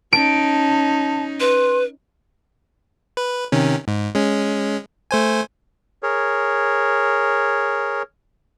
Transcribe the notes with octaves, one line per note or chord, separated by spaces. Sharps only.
C#4 D#4 A5 D7
B4 C6
B4
C3 D#3 C#4
G#2
G#3 C#4
A3 C5 G#5
G#4 A#4 C#5